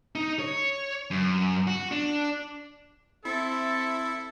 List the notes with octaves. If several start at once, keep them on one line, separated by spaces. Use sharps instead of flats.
D#4
C#5
F#2
F#4
D4
C4 E4 A4